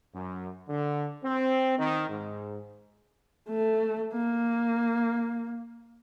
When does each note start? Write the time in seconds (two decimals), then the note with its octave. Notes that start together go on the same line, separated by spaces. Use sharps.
0.15 F#2
0.69 D3
1.24 C4
1.79 D#3
2.09 G#2
3.49 A3
4.13 A#3